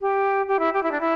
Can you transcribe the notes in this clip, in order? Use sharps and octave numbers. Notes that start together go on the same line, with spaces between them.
G4
G4
E4
G4
E4
D4
E4